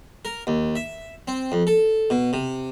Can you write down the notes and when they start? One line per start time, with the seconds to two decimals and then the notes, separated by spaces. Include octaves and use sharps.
0.25 A#4
0.47 D#2
0.76 E5
1.28 C4
1.52 F2
1.67 A4
2.10 B2
2.33 C3